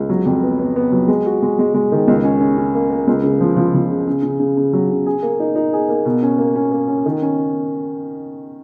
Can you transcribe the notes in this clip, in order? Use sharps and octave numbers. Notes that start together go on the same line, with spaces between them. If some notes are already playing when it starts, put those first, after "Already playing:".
Already playing: C#2
F#3
F2
B3
B3
B3
F#3
G#3
F#4
G#3
G#3
G#3
D#3
C#2
C#4
C#4
C#4
A#3
A#3
C#2
C#3
F3
F3
F3
C#3
C#3
C#3
C#3
C#3
F#3
C#3
G#4
A#3
D#4
D#4
G#4
A#3
B2
C#4
A#3
C#4
A#3
C#4
D#3
C#4